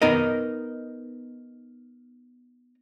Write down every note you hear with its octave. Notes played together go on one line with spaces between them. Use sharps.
B3 D#4 A#4 D#5